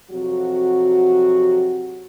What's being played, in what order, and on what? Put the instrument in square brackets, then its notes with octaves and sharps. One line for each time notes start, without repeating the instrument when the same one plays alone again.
[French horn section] F2 C3 F#3 F#4